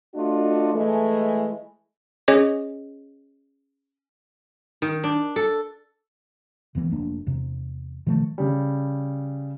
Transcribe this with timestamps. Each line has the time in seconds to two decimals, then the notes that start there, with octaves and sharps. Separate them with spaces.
0.15 A3 D4 F4 F#4 D#5
0.73 E3 G#3 A3
2.28 C#4 G#4 C#5 D#5
4.82 D#3
5.04 D4
5.36 A4
6.75 E1 D#2 E3 B3
6.91 F1 A#3 D4
7.27 E2 C3
8.07 B2 D#3 F3 A3
8.38 C#3 G3